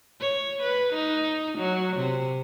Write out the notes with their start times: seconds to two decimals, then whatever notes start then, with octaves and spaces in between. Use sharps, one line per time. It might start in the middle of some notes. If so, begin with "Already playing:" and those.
0.21 C#5
0.63 B4
0.93 D#4
1.58 F#3
1.96 C3